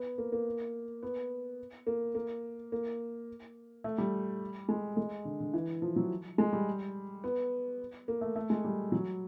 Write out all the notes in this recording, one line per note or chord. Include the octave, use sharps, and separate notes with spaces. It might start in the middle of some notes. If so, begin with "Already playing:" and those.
Already playing: B3
A#3
A#3
B3
A#3
A#3
A#3
A3
G3
G#3
G#3
D3
D3
E3
F3
F#3
G#3
G3
B3
A#3
A3
A3
G#3
G3
F#3